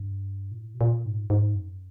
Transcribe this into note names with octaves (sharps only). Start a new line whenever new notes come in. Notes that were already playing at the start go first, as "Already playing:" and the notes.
Already playing: G2
A#2
A2
B2
A#2
G#2
G#2
F#2